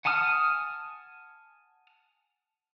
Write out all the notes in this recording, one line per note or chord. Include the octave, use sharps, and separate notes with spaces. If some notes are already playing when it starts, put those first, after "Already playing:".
F#5 G#5 A5 D#6 F6